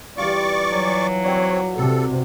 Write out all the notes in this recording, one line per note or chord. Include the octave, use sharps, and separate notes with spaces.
E3 G3 F4 D5 C#6 D6
F#3 G#5
C4 F#4 C#5 D5
C3 A4